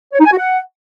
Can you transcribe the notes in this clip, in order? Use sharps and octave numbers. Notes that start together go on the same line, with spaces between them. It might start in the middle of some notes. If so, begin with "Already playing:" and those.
C#5
D#4
G#5
F#4
F#5